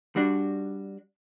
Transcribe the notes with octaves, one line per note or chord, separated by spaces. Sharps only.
G3 D4 F#4